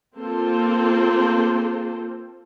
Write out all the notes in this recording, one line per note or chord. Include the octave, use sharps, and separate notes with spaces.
A#3 C4 F4 A4 C5